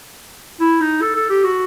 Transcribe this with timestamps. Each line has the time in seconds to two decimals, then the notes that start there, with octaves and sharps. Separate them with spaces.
0.60 E4
0.81 D#4
1.01 A4
1.16 A4
1.29 G4
1.44 F#4